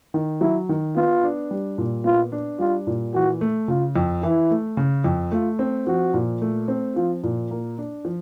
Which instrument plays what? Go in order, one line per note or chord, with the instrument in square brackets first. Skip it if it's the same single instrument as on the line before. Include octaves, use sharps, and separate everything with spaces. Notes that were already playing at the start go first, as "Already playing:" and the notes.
[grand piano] D#3
[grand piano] F#3 [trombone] E4
[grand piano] D#3
[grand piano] B3 [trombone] F4
[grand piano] D4
G3
A#2
[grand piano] B3 [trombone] F4
[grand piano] D4
[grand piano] G3 [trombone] F4
[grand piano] A#2
[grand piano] E3 [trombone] F#4
[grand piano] A3
[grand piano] C#3 [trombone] F4
[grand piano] F2
[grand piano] E3 [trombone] E4
[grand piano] A3
C#3
F2
[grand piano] A3 [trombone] F4
[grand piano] C4
[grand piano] F3 [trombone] F#4
[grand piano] A#2
A3
C4
[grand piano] F3 [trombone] F4
[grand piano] A#2
A#3
D4
F3